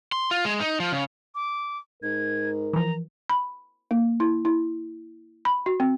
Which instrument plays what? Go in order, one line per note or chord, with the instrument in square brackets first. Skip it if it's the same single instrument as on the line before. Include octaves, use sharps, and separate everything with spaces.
[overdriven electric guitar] C6
F4
G#3
D#4
F3
C#3
[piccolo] D6
[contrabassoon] G#2 [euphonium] A#4 [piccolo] G#6
[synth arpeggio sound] E3 F3 [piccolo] A#5
[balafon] B5
A#3
E4
E4
B5
F#4
C4